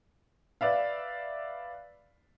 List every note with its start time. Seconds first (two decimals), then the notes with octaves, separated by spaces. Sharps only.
0.61 B4 D5 E5 F5